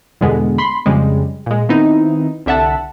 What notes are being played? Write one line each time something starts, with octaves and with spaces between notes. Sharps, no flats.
E2 G2 B2 D3 G#3 B3
B5 C6
F2 C#3 G3 G#3
A#2 G#3
D#3 B3 C4 D#4 E4
C2 D3 E5 F#5 A5